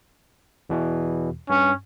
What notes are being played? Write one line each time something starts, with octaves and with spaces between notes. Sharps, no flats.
E2 B2 E3
G2 C#4